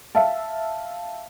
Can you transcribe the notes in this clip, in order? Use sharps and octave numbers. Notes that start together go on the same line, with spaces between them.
E5 F5 A5